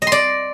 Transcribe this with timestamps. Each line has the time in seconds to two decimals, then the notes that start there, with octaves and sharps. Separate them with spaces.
0.02 D#5
0.07 C6
0.12 D5